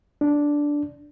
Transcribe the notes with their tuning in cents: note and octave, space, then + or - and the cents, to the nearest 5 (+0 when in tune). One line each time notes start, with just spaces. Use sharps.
D4 -5